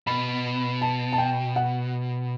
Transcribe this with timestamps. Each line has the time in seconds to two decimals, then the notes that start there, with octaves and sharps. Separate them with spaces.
0.07 B2 B5
0.81 A5
1.13 A5
1.18 G5
1.56 F#5